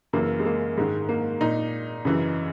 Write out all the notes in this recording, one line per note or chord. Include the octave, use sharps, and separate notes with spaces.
F#2 C#3 E3 A#3
G#3
A#3
G#2 D#3 G#3
A#3
A#2 D#4
F#2 C#3 E3